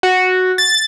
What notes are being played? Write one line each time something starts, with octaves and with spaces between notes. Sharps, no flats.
F#4
A6